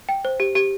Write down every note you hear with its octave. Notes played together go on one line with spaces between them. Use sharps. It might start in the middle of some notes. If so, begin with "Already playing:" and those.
G5
C5
G4
G4